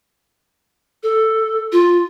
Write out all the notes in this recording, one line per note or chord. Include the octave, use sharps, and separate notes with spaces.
A4
F4